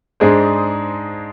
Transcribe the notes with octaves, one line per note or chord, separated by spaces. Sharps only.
G#2 G#3 D4 G#4 C5